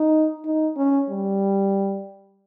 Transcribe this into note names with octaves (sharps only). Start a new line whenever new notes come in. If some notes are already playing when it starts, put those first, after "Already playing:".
Already playing: D#4
D#4
C#4
G3